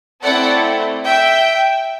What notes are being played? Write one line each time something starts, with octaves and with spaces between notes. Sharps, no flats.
A3 C4 E4 A4 D5 F#5
E5 G5